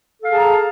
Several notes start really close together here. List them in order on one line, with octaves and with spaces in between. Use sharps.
A4 F5 G#4 A5 A#5